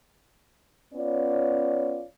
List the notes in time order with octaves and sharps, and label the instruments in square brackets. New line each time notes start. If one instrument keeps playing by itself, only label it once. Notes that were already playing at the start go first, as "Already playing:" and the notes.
[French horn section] B3 C#4 F4 C#5 D5